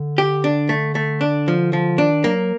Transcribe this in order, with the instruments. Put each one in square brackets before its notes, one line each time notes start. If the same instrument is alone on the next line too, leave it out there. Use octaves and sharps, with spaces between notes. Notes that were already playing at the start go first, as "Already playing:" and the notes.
Already playing: [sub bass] D3
[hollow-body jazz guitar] G4
D4
A3
A3
D4
F3
F3
[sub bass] D#3 [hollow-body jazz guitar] D4
[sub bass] F#3 [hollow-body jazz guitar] A#3